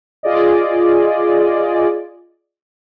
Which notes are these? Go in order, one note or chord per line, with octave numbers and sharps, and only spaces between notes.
F4 G#4 D5 D#5